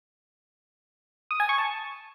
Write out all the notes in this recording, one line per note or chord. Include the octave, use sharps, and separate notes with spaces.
D#6
G#5
C#6
A5